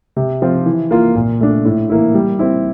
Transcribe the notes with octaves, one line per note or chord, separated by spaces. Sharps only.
C3
F3 C4 F4
E3
A#3 F4
A#2
A3 D4
A2
E3 A#3 E4
G3
C4 E4